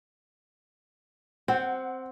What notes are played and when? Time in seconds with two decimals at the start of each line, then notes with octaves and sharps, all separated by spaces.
1.48 C4 F#5